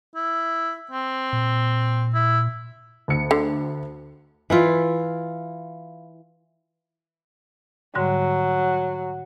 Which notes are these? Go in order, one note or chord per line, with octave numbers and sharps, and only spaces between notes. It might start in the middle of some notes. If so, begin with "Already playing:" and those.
E4
C4
A#2
E4
D2 C#7
D3
E3 E4 F4
G#2 D3 F#3 G3